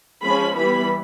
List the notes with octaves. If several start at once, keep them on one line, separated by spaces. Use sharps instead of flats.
F3 G#3 C#4 B5
E3 G3 B3 B5